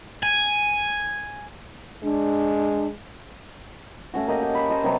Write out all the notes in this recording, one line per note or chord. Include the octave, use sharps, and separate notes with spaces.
G#5
G#3 D4
A3 C#4 F#4
A#3 G4 D#5
G4
B5
C5 C#5 D#5 A5
C3 F#3 B3